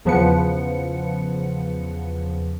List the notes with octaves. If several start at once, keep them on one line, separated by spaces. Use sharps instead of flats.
E2 C#3 F3 B3 B4 C#7